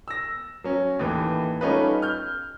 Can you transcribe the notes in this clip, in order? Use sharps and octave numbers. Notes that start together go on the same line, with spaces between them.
E6 A#6
F#3 C#4
D#2 A2 E3
G3 A3 C#4 D#4 F4 B4
F6 G6